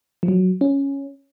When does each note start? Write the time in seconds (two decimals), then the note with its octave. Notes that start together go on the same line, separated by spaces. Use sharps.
0.23 F3
0.28 F#3
0.61 C#4